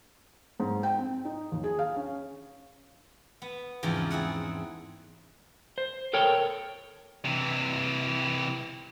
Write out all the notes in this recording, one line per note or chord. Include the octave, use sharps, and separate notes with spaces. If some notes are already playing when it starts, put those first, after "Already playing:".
G#2
G5
C4
D#4
D#2
G#4
F5
C#4
B3
E2 G#2 C#3 F3 C4
C4 E4 G#4 F#5
C5
A4 A#4 C#5 G5
C3 E3